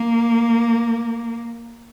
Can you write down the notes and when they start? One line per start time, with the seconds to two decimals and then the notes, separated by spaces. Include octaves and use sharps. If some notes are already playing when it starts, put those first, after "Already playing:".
Already playing: A#3